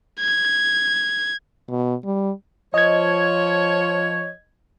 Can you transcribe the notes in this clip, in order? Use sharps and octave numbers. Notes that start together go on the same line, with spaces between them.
G#6
B2
G3
F3 C#5 D#5 G#6